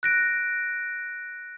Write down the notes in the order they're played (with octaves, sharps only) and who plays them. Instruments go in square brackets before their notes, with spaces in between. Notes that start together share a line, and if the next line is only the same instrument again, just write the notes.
[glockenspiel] F#6 A#6 D7